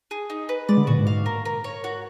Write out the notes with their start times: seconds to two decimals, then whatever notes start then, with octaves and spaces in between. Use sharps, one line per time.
0.11 G#4
0.30 D#4
0.49 B4
0.69 G#3 D5
0.77 D3
0.87 A#2 F#4
0.98 G#2
1.07 F5
1.26 A#4
1.45 A#4
1.64 C#5
1.84 F#4